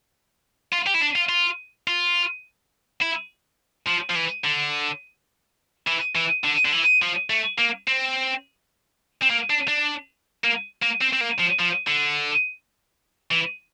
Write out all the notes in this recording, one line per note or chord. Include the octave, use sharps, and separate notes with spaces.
F4
G4
E4
D4
F4
F4
F4
E4
F3
F3
E3
D3
E3
E3
D3
D3
E3
F3
A3
A#3
C4
C4
A#3
D4
D4
A#3
A#3
C4
C4
A#3
F3
F3
D3
E3